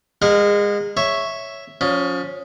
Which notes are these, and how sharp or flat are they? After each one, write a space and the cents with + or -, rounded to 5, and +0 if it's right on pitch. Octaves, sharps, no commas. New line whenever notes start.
G#3 -25 A#4 +0 F#5 -40
C#5 +0 E5 +0
F3 +35 C#4 +15